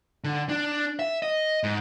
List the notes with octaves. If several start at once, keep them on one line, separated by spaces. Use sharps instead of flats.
D3
D4
E5
D#5
G#2